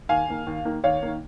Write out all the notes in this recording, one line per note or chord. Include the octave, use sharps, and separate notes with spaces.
D#2 F5 G#5
D#3 A#3
D#2
D#3 A#3
D#2 C#5 F5
D#3 A#3